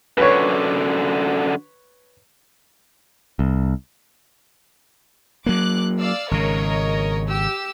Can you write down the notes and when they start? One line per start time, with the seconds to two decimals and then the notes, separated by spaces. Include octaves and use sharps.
0.17 F#2 D3 B4 C#5
3.39 C2
5.46 F#3 A#3 D6 F#6
5.99 D5 F5 E6
6.31 G#1 C#3 A#4 C#5 D#5
7.27 G4 E6